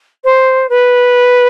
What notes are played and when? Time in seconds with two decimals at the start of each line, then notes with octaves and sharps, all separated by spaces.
0.24 C5
0.69 B4